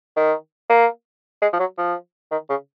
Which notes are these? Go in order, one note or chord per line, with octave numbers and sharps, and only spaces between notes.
D#3
A#3
G#3
F3
F#3
F3
D#3
C#3